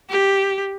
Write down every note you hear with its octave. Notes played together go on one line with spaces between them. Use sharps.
G4